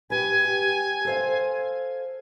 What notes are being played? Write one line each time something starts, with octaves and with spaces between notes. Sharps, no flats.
G4 B4 G#5
G4
A4 C5 F5